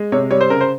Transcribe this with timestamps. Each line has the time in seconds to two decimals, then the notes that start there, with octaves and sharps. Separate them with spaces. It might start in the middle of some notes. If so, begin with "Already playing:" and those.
Already playing: G#3
0.12 C3 C#5
0.31 G3 C#5
0.41 C5
0.50 C#3 A#4
0.61 C5